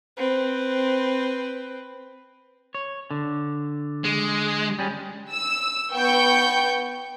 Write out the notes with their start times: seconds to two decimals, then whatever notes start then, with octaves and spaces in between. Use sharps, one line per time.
0.17 C4 B4
2.75 C#5
3.11 D3
4.04 G#3
4.79 G3 C#4 G#4
5.31 E6
5.93 B3 G5 C#6 G6